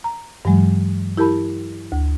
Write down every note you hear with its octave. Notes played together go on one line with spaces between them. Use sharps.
A#5
G2 E3 F#3 G#3
E4 G4 A#4 A5 B5
D2